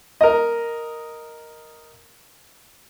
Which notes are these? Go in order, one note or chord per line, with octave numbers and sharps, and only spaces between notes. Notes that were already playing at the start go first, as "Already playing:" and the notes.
A#4 D#5